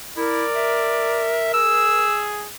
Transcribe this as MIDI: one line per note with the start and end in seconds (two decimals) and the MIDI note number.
0.17 0.45 64
0.17 2.02 70
0.17 1.31 74
0.55 1.53 76
1.54 2.49 68
1.54 2.24 88